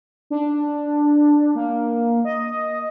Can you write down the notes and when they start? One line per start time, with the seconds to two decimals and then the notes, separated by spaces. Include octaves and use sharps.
0.30 D4
1.55 A#3
2.25 D#5